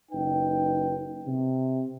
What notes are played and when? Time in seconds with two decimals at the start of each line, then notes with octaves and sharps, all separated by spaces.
0.11 F#1 D#4 B4 G5
1.27 C3